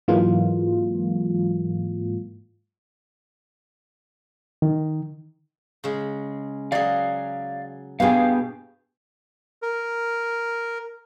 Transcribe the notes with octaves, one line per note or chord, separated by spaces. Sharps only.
G#2 E3 F#3 G#3 A#3 F4
D#3
C#3 G#3
F#3 G#4 D5 F5
G2 B2 B3 G4 G#4 F5
A#4